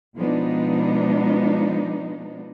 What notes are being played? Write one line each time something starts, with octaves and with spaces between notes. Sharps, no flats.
B2 F3 G#3 B3 D4 D#4